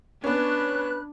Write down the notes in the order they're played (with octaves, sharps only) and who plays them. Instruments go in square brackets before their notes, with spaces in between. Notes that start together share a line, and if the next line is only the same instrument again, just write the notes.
[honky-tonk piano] B3 C#4 [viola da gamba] D4 [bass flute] B4 [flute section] B5 F#6